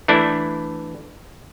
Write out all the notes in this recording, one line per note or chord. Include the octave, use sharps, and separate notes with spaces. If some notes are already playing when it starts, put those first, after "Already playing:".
E3 A3 D4 E4